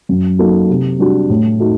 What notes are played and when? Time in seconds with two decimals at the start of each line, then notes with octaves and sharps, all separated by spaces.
0.09 F#2
0.39 F#3 A#3 D#4 A4
0.69 C3
0.99 G3 D4 F#4
1.30 A2
1.60 A3 D#4 F#4